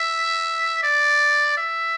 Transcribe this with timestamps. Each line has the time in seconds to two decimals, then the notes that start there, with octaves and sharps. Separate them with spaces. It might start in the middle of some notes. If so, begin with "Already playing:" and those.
Already playing: E5
0.83 D5
1.57 E5